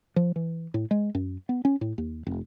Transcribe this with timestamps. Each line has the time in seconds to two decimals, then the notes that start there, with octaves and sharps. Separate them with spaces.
0.16 F3
0.36 E3
0.74 A2
0.91 G#3
1.15 F#2
1.49 B3
1.65 C#4
1.81 A2
1.98 D#2
2.27 F1